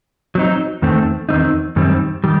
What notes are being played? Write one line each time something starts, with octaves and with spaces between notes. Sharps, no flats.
F#3 C4 D#4
E2 D#3 A3 C4
E2 D#3 G3 C4 D#4
F#2 D#3 G3 C4
D#3 G3